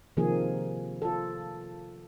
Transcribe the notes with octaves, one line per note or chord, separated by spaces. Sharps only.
C3 D#3 F3 A#3 G#4
F4 A4